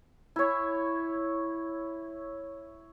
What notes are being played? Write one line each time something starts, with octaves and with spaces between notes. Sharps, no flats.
E4 C#5